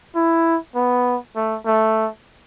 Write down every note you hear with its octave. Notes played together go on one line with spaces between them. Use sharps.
E4
B3
A3
A3